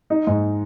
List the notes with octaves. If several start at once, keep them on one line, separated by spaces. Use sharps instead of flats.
D#4
G#2